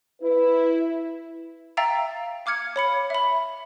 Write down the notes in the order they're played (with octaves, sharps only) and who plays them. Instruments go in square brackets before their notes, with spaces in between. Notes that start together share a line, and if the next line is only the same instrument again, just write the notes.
[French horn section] E4 [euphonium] B4
[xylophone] E5 F5 G5 A#5 E6 A6
F5 D6 F6 G#6 C#7
C#5 B5 C#7
E5 B5